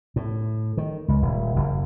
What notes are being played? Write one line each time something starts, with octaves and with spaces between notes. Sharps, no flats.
A2
D#3
C#2
D#1
F#1